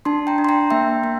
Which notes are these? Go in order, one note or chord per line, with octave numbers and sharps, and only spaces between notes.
D4 A5 C6
G5 A#5
D4
C6
G5 A#5
A#3 E5 G5
A#3